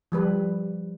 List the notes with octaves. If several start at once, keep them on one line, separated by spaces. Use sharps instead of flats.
F3 G3 B4